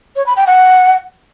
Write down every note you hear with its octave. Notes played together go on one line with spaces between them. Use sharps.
C#5
B5
G5
F#5